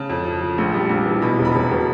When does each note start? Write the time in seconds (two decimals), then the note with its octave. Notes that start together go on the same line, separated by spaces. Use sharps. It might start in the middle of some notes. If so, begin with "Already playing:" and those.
Already playing: C#3 A5
0.10 F2
0.25 F3
0.41 F3
0.58 A#1
0.74 G3
0.89 A#1
1.06 E3
1.22 B2 B5
1.39 E1
1.45 B5
1.55 E1
1.71 B2